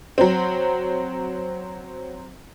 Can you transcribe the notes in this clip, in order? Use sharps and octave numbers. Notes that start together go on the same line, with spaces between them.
F#3 C4